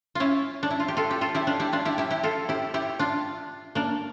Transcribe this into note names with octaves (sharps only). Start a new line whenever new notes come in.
C#4 E4 F4
D4
E4
F4
G4
F4 A4
G4
F4 A4
E4 G4
D4 F4
E4 G4
D4 F4
E4 G4
E4 G4
E4 G4
F4 A4
E4 G4
E4 G4
D4 F4
A#3 D4